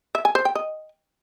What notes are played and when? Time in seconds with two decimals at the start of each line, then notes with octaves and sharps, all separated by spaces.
0.15 E5
0.25 G#5
0.35 C5
0.45 G5
0.55 D#5